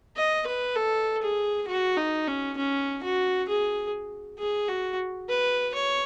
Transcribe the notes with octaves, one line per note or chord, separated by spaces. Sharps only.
D#5
B4
A4
G#4
F#4
D#4
C#4
C#4
F#4
G#4
G#4
F#4
B4
C#5